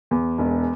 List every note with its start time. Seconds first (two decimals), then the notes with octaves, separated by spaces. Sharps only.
0.11 E2
0.38 E1